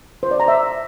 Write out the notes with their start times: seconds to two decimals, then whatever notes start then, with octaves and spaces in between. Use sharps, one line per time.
0.23 C5
0.31 D5
0.40 A#5
0.48 E5